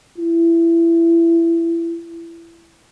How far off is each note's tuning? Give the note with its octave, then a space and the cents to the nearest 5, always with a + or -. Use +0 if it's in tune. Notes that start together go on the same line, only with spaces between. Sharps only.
E4 +20